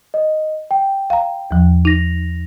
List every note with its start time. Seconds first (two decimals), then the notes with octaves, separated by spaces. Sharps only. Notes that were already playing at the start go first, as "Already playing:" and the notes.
0.14 D#5
0.71 G5
1.10 F5 A#5
1.51 E2 F3
1.85 D#4 A#6 F7